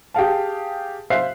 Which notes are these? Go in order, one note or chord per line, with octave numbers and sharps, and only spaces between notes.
G4 G#4 F5 A5
C5 E5 F5 F#6 C7